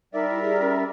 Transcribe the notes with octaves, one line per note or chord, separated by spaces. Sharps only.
G3 D#4 A#4 D5 E5
E4
G#4
C#4